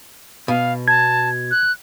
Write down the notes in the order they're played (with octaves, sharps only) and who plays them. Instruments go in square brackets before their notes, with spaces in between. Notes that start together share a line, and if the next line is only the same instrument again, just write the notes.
[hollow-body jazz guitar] B2 [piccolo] F5
[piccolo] A5 [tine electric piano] G#6
[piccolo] F#6